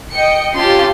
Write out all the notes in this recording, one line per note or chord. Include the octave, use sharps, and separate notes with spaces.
D#5 G5 C#7
C#4 F4 G4 A5 C6